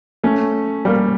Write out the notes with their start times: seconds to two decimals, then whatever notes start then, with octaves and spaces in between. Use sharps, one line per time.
0.24 A3 C#4
0.85 G3 A#3